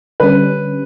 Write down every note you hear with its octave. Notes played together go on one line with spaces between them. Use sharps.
D3 G3 C#4 B4